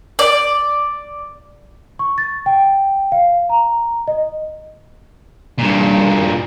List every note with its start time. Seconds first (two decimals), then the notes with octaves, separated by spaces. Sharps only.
0.19 D5
1.99 C#6
2.18 A6
2.46 G5
3.12 F5
3.49 A#5
4.08 D#5
5.59 G2 A#2